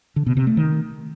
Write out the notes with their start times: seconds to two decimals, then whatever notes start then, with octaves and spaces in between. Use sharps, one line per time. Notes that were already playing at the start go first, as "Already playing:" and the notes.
0.16 D3
0.27 B2
0.37 C3
0.47 A3
0.57 D#3